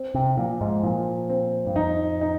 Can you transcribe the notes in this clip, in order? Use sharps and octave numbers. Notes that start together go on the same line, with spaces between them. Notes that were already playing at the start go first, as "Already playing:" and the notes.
Already playing: C4
C3
A#2 F3
G#2
A#2 F3
C4
G2
F2 D#4
D#4